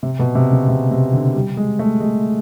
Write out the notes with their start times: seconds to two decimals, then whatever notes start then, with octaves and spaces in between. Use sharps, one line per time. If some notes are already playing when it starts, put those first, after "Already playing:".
0.03 C3
0.19 B2
0.35 C3
0.51 C#3
0.68 C3
0.91 C3
1.13 D3
1.35 G3
1.57 G#3
1.79 A3
2.00 G#3